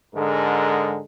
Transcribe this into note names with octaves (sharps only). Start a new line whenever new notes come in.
G#2 D3 G#3 A4 A#4